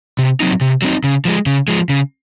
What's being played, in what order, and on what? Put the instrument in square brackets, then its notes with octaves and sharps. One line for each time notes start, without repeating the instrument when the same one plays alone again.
[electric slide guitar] C3
F#3 C4 D#4
C3
F#3 C4 D#4
C#3
F3 G#3
C#3
F3 G#3
C#3